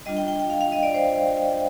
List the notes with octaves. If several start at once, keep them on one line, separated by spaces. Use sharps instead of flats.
G3 D4 F4 D#5
G5
G5
G5
F5
F5
D#5
D5
C5